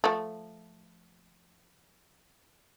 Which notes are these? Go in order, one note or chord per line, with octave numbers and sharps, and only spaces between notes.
F3 A3